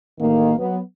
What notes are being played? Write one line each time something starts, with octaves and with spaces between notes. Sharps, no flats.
A1 D#3 A#3
F#3 B3